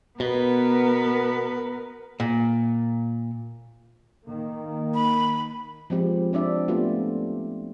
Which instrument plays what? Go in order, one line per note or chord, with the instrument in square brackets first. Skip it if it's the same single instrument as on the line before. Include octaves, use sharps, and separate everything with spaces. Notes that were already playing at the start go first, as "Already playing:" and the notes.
[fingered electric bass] B2 [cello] B3 A#4 [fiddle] B4
[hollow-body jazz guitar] A#2
[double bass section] D#3 A#3
[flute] B5
[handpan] F3 G#3 C4 G4
C4 D4 D5 E5
A3 B3 F4 G4